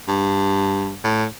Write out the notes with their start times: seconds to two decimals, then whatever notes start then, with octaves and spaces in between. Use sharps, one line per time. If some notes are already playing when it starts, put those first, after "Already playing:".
0.08 G2
1.04 A2